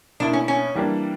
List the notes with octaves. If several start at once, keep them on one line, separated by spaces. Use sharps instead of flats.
B2 A#3 D4 E4
C#4
C#4
E3 G3 A#3 D4